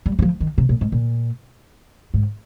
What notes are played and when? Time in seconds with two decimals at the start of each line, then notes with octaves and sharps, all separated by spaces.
0.06 G3
0.19 G3
0.22 F3
0.40 D#3
0.58 C3
0.69 A#2
0.81 G#2
0.92 A#2
2.14 G#2